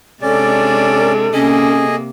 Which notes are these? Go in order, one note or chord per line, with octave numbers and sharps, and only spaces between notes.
C3 G#3 C#4 D4 A4 D5
C3 A#3 C#4 G#4 D#5